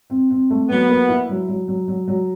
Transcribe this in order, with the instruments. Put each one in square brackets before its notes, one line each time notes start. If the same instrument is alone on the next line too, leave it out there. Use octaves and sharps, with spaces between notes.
[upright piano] C4
C4
A3
[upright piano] F#3 [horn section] B3
[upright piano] A#3
E4
F#3
F#3
F#3
F#3
F#3